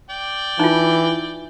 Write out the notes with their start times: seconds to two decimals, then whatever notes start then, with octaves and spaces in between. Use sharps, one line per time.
0.10 D5 G5
0.59 E3 D#4 F4